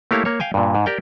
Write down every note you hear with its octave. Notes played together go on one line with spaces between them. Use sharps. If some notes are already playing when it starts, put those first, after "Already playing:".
A3 A#3 E4 G4 C#5 F5
A#3 C#5
F5 G5 G#5
G2 A#2
G#2
G4 A#4 D5 G5